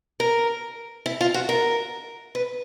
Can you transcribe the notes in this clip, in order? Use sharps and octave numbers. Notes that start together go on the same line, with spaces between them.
A#4
E4
F4
F#4
A#4
B4